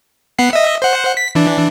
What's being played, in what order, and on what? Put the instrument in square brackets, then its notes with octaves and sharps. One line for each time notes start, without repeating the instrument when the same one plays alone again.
[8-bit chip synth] B3 F#5 C7
D#5 E5
C5 F#5
B6
E3 D4